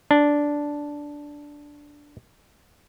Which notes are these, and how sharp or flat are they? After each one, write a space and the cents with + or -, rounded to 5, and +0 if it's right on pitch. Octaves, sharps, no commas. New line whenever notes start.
D4 -5